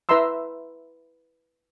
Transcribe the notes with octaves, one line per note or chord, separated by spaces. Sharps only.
E4 B4 E5 A#5 C6 E6